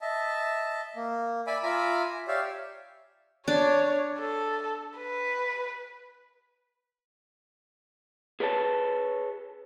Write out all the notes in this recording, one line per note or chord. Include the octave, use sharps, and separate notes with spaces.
D#5 E5 A5
A#3
D5 E5 G#5 B5 D6
F4 E5 G#5 A#5 B5 D6
G4 C#5 D5 E5 F5
D4 C#5
A4
B4
G#4 B4 C#5 E5 A5